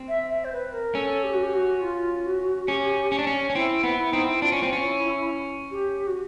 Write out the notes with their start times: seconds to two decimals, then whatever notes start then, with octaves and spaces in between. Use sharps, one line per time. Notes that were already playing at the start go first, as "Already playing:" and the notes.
Already playing: C4
0.08 E5
0.30 E5
0.45 C5
0.53 B4
0.73 A#4
0.95 C#4 A4
1.24 G4
1.33 F#4
1.43 G4
1.53 F#4
1.82 F4
2.26 F#4
2.68 C#4 G4
3.12 C#4
3.19 D4
3.27 C#4
3.50 C#4
3.55 C4 E4
3.83 B3
3.98 E4
4.12 C4 D#4
4.24 E4
4.41 D4 F4
4.52 C#4
4.63 C4
4.73 C#4
4.85 E4
5.71 G4
6.07 F#4